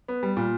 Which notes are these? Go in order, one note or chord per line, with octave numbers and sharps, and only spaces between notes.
B3
G3
A#2